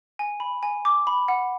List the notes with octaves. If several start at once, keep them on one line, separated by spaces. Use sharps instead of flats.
G#5
B5
G#5
D6
B5
F#5